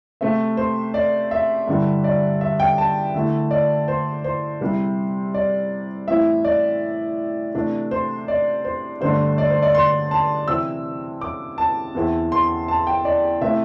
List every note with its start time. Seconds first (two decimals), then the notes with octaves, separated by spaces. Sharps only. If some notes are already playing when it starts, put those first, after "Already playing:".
0.21 C3 A3 C4 E5
0.57 C5
0.94 D5
1.31 E5
1.68 G2 D3 G3 E4
2.04 D5
2.41 E5
2.60 G5
2.78 A5
3.14 D3 A3 E4
3.51 D5
3.88 C5
4.24 C5
4.61 C3 G3 E4
5.34 D5
6.08 A2 E3 C4 E4 E5
6.45 D5
7.55 C3 E3 A3 D4
7.91 C5
8.28 D5
8.65 C5
9.01 G2 D3 A3 D4 C5
9.38 D5
9.50 C5
9.62 D5
9.75 C6
10.11 A5
10.48 C3 E3 C4 E4 E6
11.21 D6
11.58 A5
11.95 E2 E3 C4 E4
12.32 C6
12.68 A5
12.87 G5
13.05 D5
13.41 C3 A3 C4 E4 E5